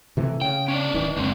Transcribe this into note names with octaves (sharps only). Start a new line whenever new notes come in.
C3 E3 A3
C#3 G5
C#4 D4 D5
D1 D#3 E3
F#1 G#3 C4 D4